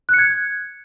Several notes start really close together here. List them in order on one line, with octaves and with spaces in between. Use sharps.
F#6 C#7 G#6